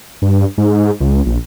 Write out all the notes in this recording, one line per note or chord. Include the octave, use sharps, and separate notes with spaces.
G2
G#2
C#2
A#1